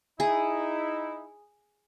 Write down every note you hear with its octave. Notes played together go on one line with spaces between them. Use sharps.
D#4 E4 G#4